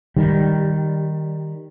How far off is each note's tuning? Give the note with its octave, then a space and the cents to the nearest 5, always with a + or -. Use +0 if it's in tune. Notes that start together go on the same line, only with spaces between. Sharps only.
D#3 +0 G3 +0